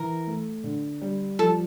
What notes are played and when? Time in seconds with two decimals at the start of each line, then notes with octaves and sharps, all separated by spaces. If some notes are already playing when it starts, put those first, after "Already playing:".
Already playing: E3 A#4
0.27 A3
0.64 D3
1.01 G3
1.39 F3 A4